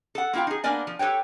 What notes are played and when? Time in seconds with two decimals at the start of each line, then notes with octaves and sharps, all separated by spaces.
0.15 A4 F#5
0.33 A#3 E4 F4 F5 G5
0.47 D#4 G#4
0.64 A#3 B3 D4 A#4 D5 G#5
0.87 F3
0.99 G4 A4 B4 C#5 G5